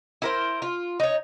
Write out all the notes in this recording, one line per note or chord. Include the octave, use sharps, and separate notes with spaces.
E4 A#4 C5
F4
D#4 C#5